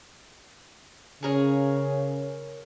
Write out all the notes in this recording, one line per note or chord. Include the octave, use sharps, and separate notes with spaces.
C#3 G#4 A#4 C#5